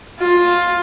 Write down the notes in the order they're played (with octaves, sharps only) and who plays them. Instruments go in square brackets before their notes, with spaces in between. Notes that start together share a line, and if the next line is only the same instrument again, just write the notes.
[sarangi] F4